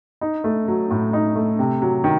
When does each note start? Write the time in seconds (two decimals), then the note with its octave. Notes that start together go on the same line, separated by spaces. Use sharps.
0.21 D#4
0.44 A3
0.68 F#3
0.91 A2
1.13 D#4
1.36 A3
1.59 C3
1.82 F#3
2.04 D#3